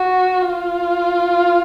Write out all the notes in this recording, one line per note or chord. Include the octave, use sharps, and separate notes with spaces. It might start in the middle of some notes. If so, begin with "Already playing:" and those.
Already playing: F#4
F4